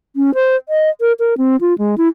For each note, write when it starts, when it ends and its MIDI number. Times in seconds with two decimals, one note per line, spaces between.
0.16 0.34 61
0.35 0.56 72
0.69 0.90 75
1.01 1.13 70
1.19 1.34 70
1.38 1.56 60
1.61 1.77 65
1.78 1.95 56
1.98 2.08 64